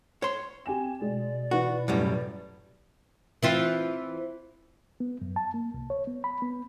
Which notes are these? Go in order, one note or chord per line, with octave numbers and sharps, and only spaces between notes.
C#5 C6
C4 G4 G#5 E7
B2 G#3 D5
E3 F#4 B4
F#2 A2 G3
E3 C4 F4
B3
F#2
A5
A#3
C2
C#5
B3
B5
B3